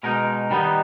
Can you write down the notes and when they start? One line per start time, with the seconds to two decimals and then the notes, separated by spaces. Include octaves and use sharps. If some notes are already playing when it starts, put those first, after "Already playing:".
0.03 B2 G#3 D#4 A#4
0.50 D#3 G3 B3 D#4